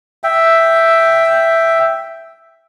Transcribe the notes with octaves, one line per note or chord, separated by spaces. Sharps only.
E5 G5